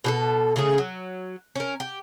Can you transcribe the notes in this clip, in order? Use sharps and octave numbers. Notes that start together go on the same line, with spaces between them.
B2 G4 A4
C#3 A3 C#4 G#4
F#3
C#4 A#4
G4